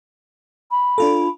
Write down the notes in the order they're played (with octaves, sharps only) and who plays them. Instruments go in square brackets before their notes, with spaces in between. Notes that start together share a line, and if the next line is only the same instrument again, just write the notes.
[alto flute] B5
[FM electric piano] D4 F4 A4